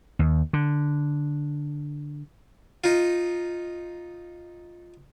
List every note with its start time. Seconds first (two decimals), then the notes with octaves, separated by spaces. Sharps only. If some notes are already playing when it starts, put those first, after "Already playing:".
0.19 D#2
0.53 D3
2.84 D#4 F4